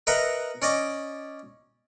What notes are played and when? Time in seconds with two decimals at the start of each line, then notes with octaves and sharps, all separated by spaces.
0.07 A#4 B4 D#5 E5 F#5 A#5
0.62 C#4 D5 D#5 D6